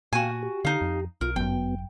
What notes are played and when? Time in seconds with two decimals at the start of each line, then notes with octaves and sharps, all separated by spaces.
0.13 A#2 F#4 F5 G5 G#5
0.43 G4
0.65 D3 D#4 F5
0.81 F2
1.21 B1 F4 A#4
1.36 G1 F#2 F#3 B3 G5